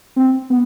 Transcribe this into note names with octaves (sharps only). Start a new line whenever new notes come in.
C4
B3